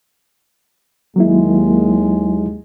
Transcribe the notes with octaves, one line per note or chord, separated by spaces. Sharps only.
D#2 F#3 G#3 A#3 E4